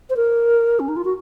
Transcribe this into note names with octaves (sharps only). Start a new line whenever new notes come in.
C5
A#4
C#4
D#4
F4
F#4